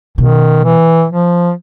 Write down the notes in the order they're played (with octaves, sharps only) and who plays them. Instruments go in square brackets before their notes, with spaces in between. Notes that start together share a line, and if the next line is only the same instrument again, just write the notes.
[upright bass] B2 [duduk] D#3
[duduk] E3
F3